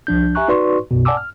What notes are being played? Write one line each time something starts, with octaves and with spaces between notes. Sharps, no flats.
C2 F3 D4 G6
G4 E5 G#5 A#5 C#6 F#6
D#4 F#4 B4 D5 C6 C#6
B1 F#2 B2
D5 F#5 G#5 A5 D6 E6
F6